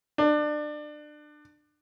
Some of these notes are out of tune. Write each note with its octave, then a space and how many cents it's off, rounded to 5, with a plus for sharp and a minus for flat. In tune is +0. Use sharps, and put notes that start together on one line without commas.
D4 +25